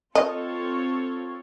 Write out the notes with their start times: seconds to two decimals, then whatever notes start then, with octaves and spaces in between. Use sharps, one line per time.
0.15 C4 F4 A4 C#5 D#5